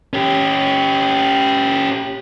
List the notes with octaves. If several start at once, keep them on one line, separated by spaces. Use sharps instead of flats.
C#4 G4